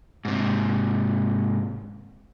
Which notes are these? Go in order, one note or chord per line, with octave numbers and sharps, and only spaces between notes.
G#2 C3